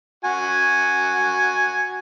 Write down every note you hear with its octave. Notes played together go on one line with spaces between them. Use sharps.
F#4 G#5